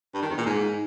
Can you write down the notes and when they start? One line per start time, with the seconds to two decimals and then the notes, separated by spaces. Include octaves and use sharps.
0.14 G2
0.22 D#3
0.30 E2
0.38 A#2
0.46 G#2